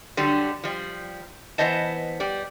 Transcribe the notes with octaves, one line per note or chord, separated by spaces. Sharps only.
D3 F#3 G3
F3 G3
E3 B3 C5 D#5 A5
G3 D5